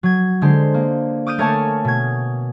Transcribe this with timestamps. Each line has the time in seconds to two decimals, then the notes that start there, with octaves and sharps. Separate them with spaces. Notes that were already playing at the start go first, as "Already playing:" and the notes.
0.03 F#3 G#6
0.41 D3 G#3 C5
0.74 A#3
1.26 D6 D#6 F6 G6 D#7
1.38 A3 A#4 C#5 G#5 A5
1.84 B2 G#6